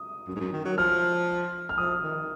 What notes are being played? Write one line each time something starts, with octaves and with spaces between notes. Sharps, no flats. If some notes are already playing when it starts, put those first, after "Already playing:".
Already playing: D#6
F#2
G#2
F#2
D#3
F#3
F3 F6
F6
F3 D#6
D#3